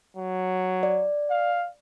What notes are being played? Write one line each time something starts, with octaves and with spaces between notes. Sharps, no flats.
F#3
D5
F5